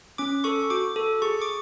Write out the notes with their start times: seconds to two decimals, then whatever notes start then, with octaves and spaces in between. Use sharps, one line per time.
0.18 C#4 D6
0.44 A4 C#6
0.70 F#4 D6
0.96 A4
1.22 G#4 C#6
1.42 D6